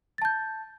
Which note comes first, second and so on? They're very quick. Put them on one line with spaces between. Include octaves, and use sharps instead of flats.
A6 A5 G6